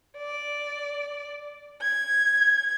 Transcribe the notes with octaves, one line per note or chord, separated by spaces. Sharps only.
D5
G#6